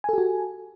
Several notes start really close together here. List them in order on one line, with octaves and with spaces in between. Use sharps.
G#5 A4 G4 F#4